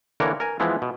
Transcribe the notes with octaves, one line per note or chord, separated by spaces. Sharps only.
D3 E3 A#3 A#4 C#5
A#4 G#5
E3 F3 G#3 B3 E4
B2